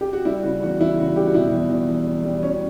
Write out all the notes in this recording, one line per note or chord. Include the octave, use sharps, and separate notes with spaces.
G4
F#4
G3 E4
C#3 F#4
E2 F#4
E3 E4
C#3 F#4
G3 G4
F#4
B2 E4
E2
E2
E2
G3
G3
F#3 C#4